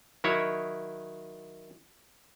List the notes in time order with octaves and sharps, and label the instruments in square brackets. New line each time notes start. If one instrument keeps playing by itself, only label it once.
[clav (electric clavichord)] D#3 F#3 E4 C#5